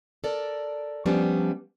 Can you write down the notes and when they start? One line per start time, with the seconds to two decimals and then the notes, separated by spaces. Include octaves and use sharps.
0.24 A4 A#4 D5
1.06 F3 G3 B3 C#4 D4